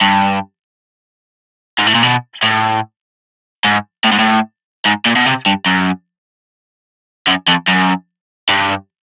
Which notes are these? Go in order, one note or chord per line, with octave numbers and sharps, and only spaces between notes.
G2
G#2
A2
A#2
B2
A2
G#2
A2
G#2
A2
G#2
A#2
B2
C3
G2
F#2
F#2
F2
F#2
G2